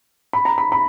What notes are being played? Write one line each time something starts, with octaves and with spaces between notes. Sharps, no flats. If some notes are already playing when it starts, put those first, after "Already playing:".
B5
A#5
B5
B5